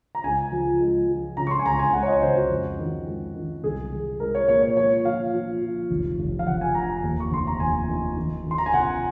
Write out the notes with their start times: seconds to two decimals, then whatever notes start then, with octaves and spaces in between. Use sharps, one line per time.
0.15 A#5
0.24 C#2 G#5
0.52 F3
0.81 G#3
1.09 F3
1.37 C#3 A#5
1.47 C#6
1.51 C6
1.59 G#5
1.65 C#2 A#5
1.79 G#5
1.93 G#3 F#5
2.03 C#5
2.08 D#5
2.22 C#3 C5
2.36 F#4
2.50 F2
2.79 D#3
3.07 G#3
3.35 D#3
3.64 C2 G#4
3.92 C2
4.20 G#3 A#4
4.35 C#5
4.48 A#2 C#5
4.62 C#5
4.76 F3 C#5
5.05 F3 F5
5.34 F3
5.62 F3
5.91 F1
6.19 F1
6.39 F5
6.47 F1 F#5
6.61 G#5
6.75 F2 A#5
6.89 A#5
7.04 D#2
7.20 C#6
7.31 F1 C6
7.47 A#5
7.60 D#2 G#5
7.88 D#3
8.17 D#3
8.45 D#3
8.51 C6
8.58 A#5
8.66 G#5
8.73 C3 F#5